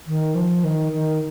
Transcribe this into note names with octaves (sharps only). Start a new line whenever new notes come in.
D#3
F3
D#3
D#3